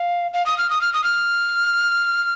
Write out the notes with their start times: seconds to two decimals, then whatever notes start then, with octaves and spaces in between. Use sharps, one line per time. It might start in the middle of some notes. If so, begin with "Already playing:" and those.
Already playing: F5
0.34 F5
0.46 D#6
0.58 F6
0.70 D#6
0.81 F6
0.94 D#6
1.04 F6